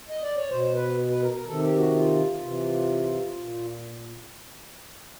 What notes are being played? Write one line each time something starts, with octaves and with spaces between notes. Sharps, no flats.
D#5
D5
C#5
B2 C5
B4
B4
A#4
A#4
C3 D#3 A4
G4
F#4
F4
C3 E3
A#2